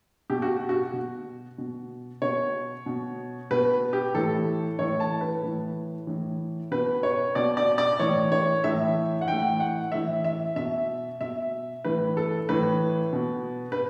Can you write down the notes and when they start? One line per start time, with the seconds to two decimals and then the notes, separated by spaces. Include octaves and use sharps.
0.30 B2 G4
0.42 F#4
0.69 F#4
0.93 B2
1.58 B2
2.22 B2 C#5
2.86 B2
3.51 B2 B4
3.93 G4
4.14 A2 E3 A4
4.79 A2 E3 C#5
5.00 A5
5.21 B4
5.43 A2 E3
6.07 A2 E3
6.71 B2 B4
7.03 C#5
7.35 B2 D5
7.57 D5
7.78 D5
8.00 A2 E3 C#5
8.32 C#5
8.64 A2 E3 E5
9.21 F#5
9.28 A2 E3 G5
9.60 F#5
9.92 A2 E3 E5
10.24 E5
10.56 B2 E5
11.21 B2 E5
11.84 A2 E3 B4
12.17 A4
12.49 A2 E3 B4
13.13 B2
13.72 B4